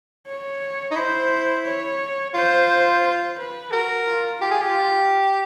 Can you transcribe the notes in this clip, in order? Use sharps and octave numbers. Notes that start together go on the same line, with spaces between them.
C#5
D#4
E4 C5
C#5
F4 C5
C5
B4
F#4 A#4
F4
F4 G4
G#4
G4